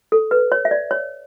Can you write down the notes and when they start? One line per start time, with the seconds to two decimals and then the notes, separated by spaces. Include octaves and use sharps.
0.12 A4
0.31 B4
0.52 C#5
0.65 E5
0.71 D5
0.91 C#5